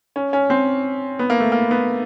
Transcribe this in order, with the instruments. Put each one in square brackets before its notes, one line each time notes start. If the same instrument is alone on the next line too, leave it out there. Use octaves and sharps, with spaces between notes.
[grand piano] C#4
C#4
C4
B3
A#3
A3
A#3
B3